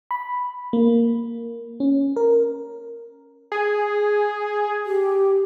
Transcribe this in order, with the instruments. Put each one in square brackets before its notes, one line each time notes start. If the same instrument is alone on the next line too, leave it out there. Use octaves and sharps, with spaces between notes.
[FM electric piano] B5
A#3
C#4
A#4
[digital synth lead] G#4
[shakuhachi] G4